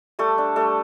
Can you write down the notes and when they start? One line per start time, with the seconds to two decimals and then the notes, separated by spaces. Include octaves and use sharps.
0.19 G3 A3 A4
0.38 D4
0.56 G3 A3 A4